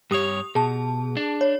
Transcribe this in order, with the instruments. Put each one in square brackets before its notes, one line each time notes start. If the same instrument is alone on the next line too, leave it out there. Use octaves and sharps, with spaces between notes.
[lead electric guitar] G2 C#5 [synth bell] G4 D#6 F7
[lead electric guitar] B2 [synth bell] G#4 A5
[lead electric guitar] D4
[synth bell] C#5